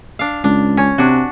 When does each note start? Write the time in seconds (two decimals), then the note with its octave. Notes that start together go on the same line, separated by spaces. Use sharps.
0.19 D4 F5
0.44 C#2 D4
0.77 C#4
0.98 C3 D4 F#4